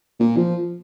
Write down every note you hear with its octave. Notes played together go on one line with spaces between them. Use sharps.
A#2
F3